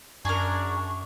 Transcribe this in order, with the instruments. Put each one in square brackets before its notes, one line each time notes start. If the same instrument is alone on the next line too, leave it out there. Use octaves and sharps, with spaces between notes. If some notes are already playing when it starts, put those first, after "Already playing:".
[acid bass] F#2 [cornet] D4 [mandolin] G#4 A#4 [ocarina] C#6